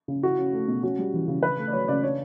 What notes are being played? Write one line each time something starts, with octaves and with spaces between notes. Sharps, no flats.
C#3
E4 F#4
C#4
A3
B2
C#4 F#4
G3
E3
C#3
D4 B4
A3
D5
F#3 C#5
C#3 D5
D4 C#5